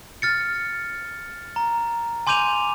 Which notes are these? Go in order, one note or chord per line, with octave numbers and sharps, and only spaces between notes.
F6 A6 C#7
A#5
G#5 C6 D6 G6 D#7 F7